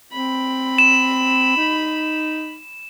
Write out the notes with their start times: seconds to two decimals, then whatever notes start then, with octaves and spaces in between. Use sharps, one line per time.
0.13 C4 B5
0.78 E7
1.57 D#4